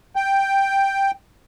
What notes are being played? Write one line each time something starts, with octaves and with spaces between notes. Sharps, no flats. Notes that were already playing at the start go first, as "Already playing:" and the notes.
G5